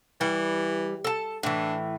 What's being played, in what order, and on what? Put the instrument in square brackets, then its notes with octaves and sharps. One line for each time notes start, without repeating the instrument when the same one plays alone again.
[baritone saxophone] E3 [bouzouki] G3
[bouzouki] A4 A5
[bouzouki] A2 E3 [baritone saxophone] D4